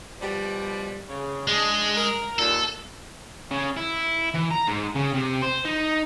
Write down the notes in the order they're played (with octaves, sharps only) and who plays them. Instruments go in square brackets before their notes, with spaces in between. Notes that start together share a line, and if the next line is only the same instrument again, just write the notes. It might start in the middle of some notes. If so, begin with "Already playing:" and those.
[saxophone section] B2 F3 G3
C#3
[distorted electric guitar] G#3 [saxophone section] D4 G#4
[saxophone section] A#4
[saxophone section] D#2 A#2 [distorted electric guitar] A4
[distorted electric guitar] C#3
E4
E3
A#5
G#2
C#3
C3
C5
D#4